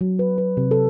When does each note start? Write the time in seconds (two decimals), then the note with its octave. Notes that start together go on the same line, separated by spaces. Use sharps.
0.01 F#3
0.19 B4
0.38 B4
0.57 C3
0.71 A4